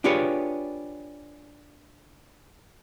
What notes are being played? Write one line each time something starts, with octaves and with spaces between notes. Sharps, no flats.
D4 F4 G4 G#4 B4 C#5